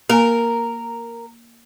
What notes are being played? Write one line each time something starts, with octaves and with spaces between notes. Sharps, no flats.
A#3 A#4 G#5